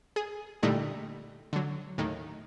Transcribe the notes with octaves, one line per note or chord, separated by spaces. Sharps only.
G#4
A#2 D3 G3 A3 D#4 E4
D3 F#3
D#2 A2 D#3